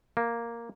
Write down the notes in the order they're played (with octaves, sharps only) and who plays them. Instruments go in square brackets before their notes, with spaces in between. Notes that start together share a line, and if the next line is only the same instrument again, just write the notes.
[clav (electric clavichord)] A#3